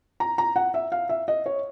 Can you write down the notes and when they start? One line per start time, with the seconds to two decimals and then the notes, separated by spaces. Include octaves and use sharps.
0.20 A#5
0.38 A#5
0.56 F#5
0.74 E5
0.92 F5
1.09 E5
1.28 D#5
1.46 C#5